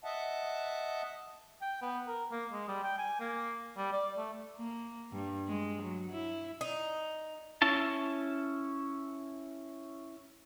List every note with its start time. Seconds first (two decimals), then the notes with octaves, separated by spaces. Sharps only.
0.04 D#5 E5 F#5 A5
1.61 G5
1.82 B3
2.08 A#4
2.31 A#3
2.52 G#3
2.68 G3
2.83 G5
2.99 G#5
3.20 A#3
3.77 G3
3.93 D5
4.18 A3
4.57 A#3
5.12 G2
5.48 G#3
5.82 F#3
6.11 E4
6.61 D#4
7.62 C#4 E4 A5